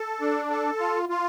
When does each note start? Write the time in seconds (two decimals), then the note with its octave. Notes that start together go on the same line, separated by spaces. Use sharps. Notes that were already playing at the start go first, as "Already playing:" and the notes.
Already playing: A4
0.21 D4
0.50 A4
0.80 F4
1.09 F4